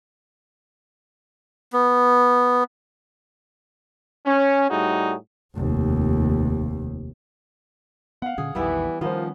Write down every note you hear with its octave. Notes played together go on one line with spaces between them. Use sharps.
B3
C#4
A2 G3 D#4 F#4 G#4
F1 D#2
B3 F5 F#5
A#2 D3 C#4 G#4
A#1 E2 D#3 E3 G3 B3 E4
D#3 F3 G3 B3 C#4 F4 A#4 C5